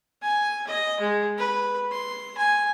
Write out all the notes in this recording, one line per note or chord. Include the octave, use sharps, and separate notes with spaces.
G#5
D#5
G#3
B4
C6
G#5